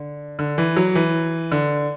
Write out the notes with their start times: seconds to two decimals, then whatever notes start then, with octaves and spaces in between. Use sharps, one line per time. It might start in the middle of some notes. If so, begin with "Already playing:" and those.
Already playing: D3
0.39 D3
0.58 E3
0.76 F#3
0.95 E3
1.52 D3